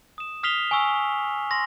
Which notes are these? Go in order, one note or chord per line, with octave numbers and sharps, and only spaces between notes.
D#6 E7
D#6 F6 B6 C7 F7 G7
G#5 C#6 E6
C6 A#6